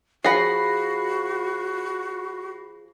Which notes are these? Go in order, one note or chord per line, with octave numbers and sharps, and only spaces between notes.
F3 F#4 G#4 F#5 B5 A#6 C7